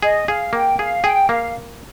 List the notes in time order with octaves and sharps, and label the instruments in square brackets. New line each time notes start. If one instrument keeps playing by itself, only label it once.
[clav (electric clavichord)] G#4 [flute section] D#5
[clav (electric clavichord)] G#4 [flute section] F5
[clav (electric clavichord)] A#3 [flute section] G5
[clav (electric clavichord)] G#4 [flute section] F5
[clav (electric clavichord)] G#4 [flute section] G5
[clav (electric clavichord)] A#3 [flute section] F5